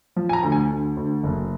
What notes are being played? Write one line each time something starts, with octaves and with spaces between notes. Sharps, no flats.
F3
G#5
A#5
D2
G#5
D2
D2
F#1